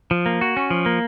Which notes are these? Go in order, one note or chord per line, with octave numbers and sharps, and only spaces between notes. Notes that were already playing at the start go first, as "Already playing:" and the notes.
F3
A#3
F#4
C#4
F3
A#3